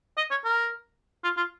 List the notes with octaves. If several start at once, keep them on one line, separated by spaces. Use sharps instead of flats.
D#5
C#5
A#4
F4
F4